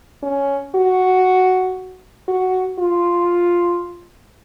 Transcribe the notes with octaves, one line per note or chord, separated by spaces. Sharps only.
C#4
F#4
F#4
F4